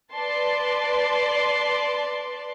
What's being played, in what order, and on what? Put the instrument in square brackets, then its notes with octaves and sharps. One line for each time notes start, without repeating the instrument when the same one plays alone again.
[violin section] B4 D5 A5 C6